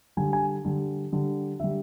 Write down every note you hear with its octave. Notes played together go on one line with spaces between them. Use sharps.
D3 G3 G#5
G#5
D3 G3
D3 G3
D3 G3 E5